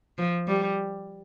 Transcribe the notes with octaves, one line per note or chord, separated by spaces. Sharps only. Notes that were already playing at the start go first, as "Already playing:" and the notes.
F3
G3